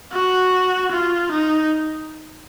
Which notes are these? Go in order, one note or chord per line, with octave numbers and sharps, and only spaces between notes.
F#4
F4
D#4